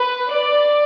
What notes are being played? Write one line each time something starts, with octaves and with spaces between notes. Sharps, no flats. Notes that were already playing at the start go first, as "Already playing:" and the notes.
Already playing: B4
D5